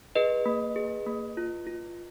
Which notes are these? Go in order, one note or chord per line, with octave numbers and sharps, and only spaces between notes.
G#4 B4 D#5
A#3
G#4
A#3
F4
F4